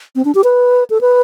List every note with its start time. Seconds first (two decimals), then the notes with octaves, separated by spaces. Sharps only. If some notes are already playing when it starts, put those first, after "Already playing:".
0.16 C4
0.25 D4
0.35 G4
0.44 B4
0.90 A4
1.01 B4